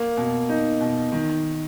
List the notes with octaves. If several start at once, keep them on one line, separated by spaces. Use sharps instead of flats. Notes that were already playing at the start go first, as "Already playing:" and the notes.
Already playing: A#3
B2
D#4
B2
D#3